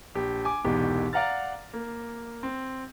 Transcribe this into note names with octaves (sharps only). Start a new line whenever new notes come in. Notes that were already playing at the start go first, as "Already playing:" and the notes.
A#1 G4
G#5 D6
E1 C2 G#2 B2 E3 G4
D5 F5 F#5 A#5 F6 A6
A#3
C4